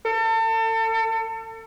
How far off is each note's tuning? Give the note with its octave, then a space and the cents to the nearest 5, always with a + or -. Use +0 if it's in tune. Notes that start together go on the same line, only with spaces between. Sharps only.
A4 +35